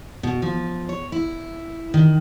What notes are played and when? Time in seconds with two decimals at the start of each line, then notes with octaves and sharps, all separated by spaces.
0.23 B2
0.42 F3
0.89 C#5
1.12 E4
1.94 D#3